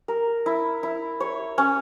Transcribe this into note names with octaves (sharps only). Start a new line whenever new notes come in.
A#4
E4
E4
C#5
C#4